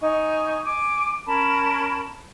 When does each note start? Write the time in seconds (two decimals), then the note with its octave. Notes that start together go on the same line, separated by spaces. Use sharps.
0.02 D#4 G#5 C#6
0.65 G#5 D6
1.26 C#4 A#4 A5 B5